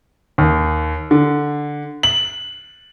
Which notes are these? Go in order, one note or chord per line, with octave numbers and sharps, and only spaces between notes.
D#2
D3
F#7